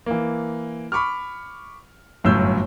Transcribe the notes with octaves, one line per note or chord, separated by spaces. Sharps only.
E3 A#3
B5 C#6 D6 F6
G1 F#2 A2 E6 G6